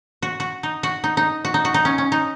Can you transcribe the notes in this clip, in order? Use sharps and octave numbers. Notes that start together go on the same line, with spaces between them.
F#4
F#4
D#4
F#4
D#4
D#4
F#4
D#4
F#4
D#4
C#4
C#4
D#4